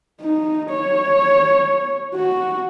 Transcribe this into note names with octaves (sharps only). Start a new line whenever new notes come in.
D#4
C#5
F#4